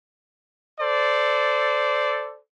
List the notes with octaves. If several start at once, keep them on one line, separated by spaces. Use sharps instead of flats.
A4 C5 D5